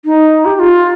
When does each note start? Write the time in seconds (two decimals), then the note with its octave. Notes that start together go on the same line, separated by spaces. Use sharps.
0.05 D#4
0.45 G4
0.56 G4
0.59 F4